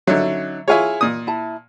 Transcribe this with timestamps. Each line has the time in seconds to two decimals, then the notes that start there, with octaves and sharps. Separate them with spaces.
0.07 D3 F#3 C#4 D#4 E5
0.68 E4 F4 G#4 C#5 G#5
1.01 A#2 D#6
1.27 E4 A5